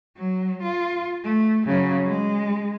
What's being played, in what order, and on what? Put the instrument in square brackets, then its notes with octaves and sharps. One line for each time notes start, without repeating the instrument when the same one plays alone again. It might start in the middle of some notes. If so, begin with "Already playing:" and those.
[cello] F#3
F4
A3
C#3 F#3
G#3